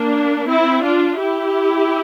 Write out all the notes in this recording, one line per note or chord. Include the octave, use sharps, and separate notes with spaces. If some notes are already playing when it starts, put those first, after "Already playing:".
Already playing: A#3 D4
C4 E4
D4 F4
E4 G4